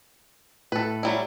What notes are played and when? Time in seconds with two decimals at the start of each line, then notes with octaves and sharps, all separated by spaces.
0.72 A2 A4 B4
1.03 F#3 G3 E4